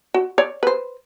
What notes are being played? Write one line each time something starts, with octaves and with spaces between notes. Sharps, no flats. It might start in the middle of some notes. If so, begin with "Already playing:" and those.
F#4
C#5 D5
B4 C5